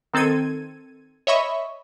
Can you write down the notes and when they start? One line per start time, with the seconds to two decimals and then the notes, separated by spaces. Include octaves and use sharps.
0.14 D#3 C4 A4 G#6 D#7
1.27 C#5 D#5 E5 B5 C#6